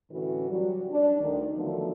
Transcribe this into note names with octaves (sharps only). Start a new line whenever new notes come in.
A2 D3 E3 C#4 F#4 B4
F#3 G3 F#4
D4
D2 D#3
D3 D#3 F3 F#3 A3 B3